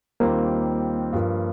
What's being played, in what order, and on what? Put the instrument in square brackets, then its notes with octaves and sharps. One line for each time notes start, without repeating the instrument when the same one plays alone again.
[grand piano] D#2 D#3 G3 C4 F4 [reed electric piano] A#3
[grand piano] G2 F3 A#3